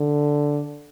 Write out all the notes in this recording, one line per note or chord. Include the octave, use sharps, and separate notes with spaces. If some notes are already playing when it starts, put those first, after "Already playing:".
Already playing: D3